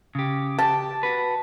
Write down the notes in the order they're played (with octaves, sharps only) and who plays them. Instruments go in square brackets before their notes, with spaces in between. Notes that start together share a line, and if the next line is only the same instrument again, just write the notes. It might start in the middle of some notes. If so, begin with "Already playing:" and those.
[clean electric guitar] C#3 G4
[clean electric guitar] G4 [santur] A5
[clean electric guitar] F#4 B4